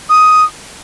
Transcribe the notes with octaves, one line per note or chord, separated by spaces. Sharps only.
D#6